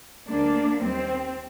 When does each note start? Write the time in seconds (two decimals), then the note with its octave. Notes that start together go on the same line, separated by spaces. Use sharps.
0.27 D2 D3 G#3 A#3 D4
0.81 D#2 D#3 G3 C4